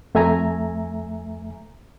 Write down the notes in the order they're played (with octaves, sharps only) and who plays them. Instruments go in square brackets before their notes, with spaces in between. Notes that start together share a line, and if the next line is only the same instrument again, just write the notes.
[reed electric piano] F2 A3 E5 G#5 A#5